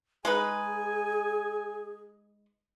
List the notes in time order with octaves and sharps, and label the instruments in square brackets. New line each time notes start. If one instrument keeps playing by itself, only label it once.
[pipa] G#3 D#4 B4 [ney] G#4 [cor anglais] G#5